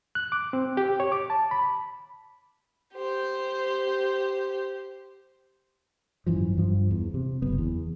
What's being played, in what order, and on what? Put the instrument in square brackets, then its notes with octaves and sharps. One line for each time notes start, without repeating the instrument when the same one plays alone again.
[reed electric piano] F#6
D6
C4
G4
C#5
D6
A5
B5
[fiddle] G4 C5
[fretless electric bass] G#1 F#2 E3 F3
G2 F3
E2
C3
F#1 B3
E2